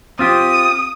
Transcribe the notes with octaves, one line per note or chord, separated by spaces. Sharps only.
C4 F4 G4 D#6